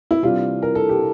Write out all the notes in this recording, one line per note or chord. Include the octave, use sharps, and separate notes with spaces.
E4
C3 E3 G3 D4 F4
A#4
A4
G4